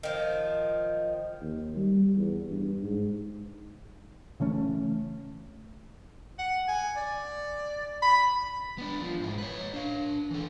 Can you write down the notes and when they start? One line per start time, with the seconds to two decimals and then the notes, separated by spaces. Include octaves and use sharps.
0.03 D#3 F3
1.41 D#2
1.76 G3
2.16 E2
2.49 G2
2.83 G#2
4.40 C#3 E3 A3 C#4
6.39 F#5
6.68 G#5
6.97 D5
8.02 B5
8.78 B3 D4
9.01 F3
9.20 G#2 E4
9.38 B4 C#5
9.74 D4 F5
10.31 E3 A4